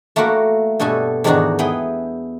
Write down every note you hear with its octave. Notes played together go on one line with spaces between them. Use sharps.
A3 A#3 E4 F#4 A#4 F#5
G2 B2 F#4 A4 G#5
E2 G#2 D#3 D4 F#4 A#5
B3 E4 G#4 G5